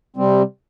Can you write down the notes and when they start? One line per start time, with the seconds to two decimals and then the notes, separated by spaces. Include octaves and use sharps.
0.16 C3 G3 C4